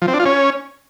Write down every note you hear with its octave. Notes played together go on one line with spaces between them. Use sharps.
F3
C4
D4
F4
C#4